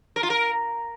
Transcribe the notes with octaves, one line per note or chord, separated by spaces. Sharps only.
A#4
F4
A#4